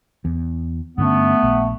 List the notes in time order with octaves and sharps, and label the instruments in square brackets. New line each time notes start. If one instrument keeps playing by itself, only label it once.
[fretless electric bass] E2
[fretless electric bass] G2 D3 C#4 [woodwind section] A3 B3
[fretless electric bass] A#1